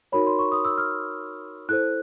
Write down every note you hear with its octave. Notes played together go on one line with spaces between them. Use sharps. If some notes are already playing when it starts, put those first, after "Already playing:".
D#4 F#4 A#4 C#5 B5
C6
C#6
D#6
E6
F6
E4 A4 C5 F#6